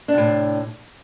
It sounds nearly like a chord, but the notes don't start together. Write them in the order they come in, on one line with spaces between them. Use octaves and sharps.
D4 C3 A2